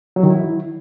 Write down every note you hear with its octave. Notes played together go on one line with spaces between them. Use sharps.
F#3
D#3
E4